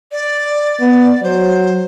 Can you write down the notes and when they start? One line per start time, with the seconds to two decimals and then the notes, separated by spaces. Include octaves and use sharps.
0.12 D5
0.80 B3
1.23 F#3 C5